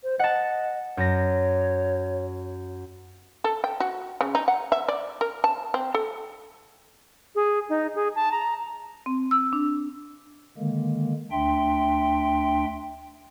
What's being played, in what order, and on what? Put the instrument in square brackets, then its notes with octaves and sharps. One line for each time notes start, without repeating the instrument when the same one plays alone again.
[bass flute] C5
[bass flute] D#5 [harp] F#5 A5
[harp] F#2 A#6 [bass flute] C#5
[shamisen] A4
G5
F#4
C#3
D#4
F#5
E5
D5
A#4
A5
C4
A4
[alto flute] G#4
D#4
G#4
A5
A#5
[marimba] C4
E6
D4
[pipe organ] D3 D#3 G#3 A#3
D2 D4 E5 G5 C6